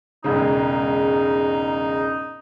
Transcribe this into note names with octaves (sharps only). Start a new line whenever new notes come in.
E1 G#2 C#3 D#4